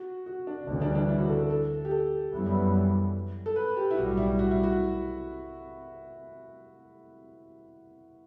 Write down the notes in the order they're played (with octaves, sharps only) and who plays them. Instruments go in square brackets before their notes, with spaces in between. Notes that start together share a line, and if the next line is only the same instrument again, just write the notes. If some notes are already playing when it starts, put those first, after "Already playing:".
Already playing: [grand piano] F#4
F#4
D4
[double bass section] D2 C#3 E3 G3 [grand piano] D4
[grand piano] D4
D4
E4
F#4
A4
A4
A4
G4
A4
[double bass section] F#2 E3 G3 B3
[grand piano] A4
B4
G4
E4
[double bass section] B1 A2 G3 [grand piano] F#4
[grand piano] E4
F#4
E4
F#4